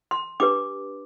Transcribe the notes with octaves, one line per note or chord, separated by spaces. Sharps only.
C6
D4 G4 B4 D6